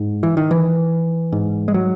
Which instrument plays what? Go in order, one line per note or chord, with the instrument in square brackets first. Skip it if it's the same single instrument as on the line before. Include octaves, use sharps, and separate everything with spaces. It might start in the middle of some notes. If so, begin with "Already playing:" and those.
Already playing: [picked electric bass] G#2
E3
D#3
E3
G#2
G#3
F#3